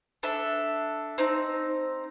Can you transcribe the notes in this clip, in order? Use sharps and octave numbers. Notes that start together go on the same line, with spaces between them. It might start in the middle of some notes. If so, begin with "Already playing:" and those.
D4 A4 E5
C4 D#4